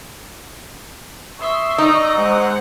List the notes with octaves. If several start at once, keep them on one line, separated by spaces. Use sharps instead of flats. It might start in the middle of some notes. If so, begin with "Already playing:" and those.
E5 C6 C#6 D#6 E6
D#4 D5 A#5
G#3 C5 F#5